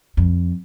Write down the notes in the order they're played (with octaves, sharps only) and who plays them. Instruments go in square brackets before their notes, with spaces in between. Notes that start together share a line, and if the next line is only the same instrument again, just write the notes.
[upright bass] F2